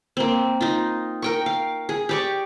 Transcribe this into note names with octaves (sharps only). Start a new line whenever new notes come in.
A#3 C4
D#4 F4
A#4 G5 C#6
F5
G#4
G4 D5 C#6